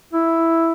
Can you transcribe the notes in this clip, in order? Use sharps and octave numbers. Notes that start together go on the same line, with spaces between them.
E4